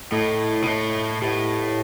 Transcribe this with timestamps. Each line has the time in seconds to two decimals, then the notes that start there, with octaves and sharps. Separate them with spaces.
0.12 A2 A3 E4 A4 D#5
0.62 B2
0.67 A2
1.22 A2 G4 B4 D#5 F#5